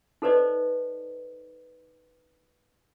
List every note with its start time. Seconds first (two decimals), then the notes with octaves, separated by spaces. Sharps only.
0.22 D#4 A4 B4 C5 D5 D#5